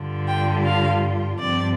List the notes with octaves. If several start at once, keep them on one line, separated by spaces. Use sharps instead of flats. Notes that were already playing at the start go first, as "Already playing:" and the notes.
Already playing: G2 D3 G3 F4
G5
F5
G2 F3 C4 D5